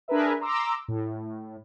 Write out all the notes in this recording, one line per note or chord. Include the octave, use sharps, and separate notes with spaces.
D4 G#4 A#4 B4 E5
A#5 C6 D6 E6
A2